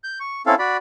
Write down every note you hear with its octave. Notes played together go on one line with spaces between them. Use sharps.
G6
C#6
C4 C#4 E4 A4 F5
F#4 D5 B5